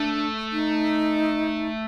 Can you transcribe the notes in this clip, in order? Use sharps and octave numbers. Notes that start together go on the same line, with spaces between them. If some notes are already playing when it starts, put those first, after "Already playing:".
Already playing: A3 D4
D#4